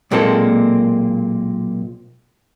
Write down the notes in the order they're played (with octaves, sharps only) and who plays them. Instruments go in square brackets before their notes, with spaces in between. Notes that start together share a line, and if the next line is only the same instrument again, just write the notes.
[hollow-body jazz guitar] B1 A#2 G#3 A#3 C4 A4